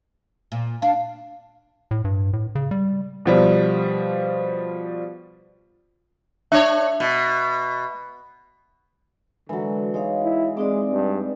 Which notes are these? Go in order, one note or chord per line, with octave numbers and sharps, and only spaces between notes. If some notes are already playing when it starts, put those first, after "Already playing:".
A#2
D4 F5
A2
G2
A2
C#3
G3
B2 F3 G3
D4 C#5 E5
B2
D3 E3 F#3 G#3 F#4
G#3 D#4 C#5 F5
E4
G#3 C4 D#4 D5 E5 D6
G2